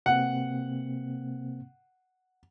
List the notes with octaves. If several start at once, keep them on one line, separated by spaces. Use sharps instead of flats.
C3 A#3 C4 F#5